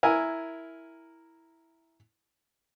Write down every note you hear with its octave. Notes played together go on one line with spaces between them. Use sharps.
E4 A#4 G#5